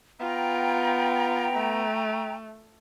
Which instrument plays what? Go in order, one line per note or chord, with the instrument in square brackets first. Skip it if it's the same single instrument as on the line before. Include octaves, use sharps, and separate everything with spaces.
[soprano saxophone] B3 [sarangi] F4 [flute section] G5 A#5
[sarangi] A3